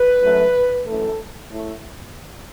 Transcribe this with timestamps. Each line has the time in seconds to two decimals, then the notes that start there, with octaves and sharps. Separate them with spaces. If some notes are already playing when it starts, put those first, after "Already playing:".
Already playing: B4
0.21 F#2 F#3 A3
0.85 F#2 E3 A3 A4
1.49 A2 A3